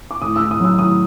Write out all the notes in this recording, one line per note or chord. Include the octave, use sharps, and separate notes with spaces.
D6
A2 D#6
E6
A2
D#6
F#3 E6
A2 D#6